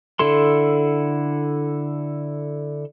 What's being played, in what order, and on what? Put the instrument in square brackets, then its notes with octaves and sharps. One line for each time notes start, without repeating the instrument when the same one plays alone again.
[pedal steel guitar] D3 E4 A4 C6